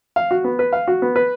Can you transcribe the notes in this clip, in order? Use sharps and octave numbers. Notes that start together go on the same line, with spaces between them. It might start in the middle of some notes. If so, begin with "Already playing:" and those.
F5
F#4
B3
B4
F5
F#4
B3
B4